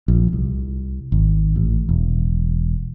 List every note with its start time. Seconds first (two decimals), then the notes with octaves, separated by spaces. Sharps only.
0.08 A#1
0.33 C2
1.12 G#1
1.56 A1
1.89 E1